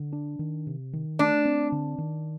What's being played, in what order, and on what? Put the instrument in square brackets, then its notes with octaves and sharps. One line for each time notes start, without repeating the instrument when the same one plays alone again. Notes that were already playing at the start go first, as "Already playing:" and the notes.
Already playing: [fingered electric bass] D3
D4
D#3
C3
D#3
[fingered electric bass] A3 [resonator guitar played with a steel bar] D4
[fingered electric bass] C4
D3
D#3